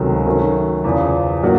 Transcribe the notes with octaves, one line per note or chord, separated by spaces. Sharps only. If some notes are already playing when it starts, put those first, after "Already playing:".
Already playing: C#2 C3 D#3 F#3 A3
D#3 F#3 A3 C#4
E2 C#3 F3
A2 F#3 A#3 D4 F#4